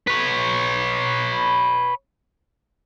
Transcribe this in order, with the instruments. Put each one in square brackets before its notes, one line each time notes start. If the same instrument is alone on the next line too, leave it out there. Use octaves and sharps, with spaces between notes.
[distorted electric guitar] B4 C#5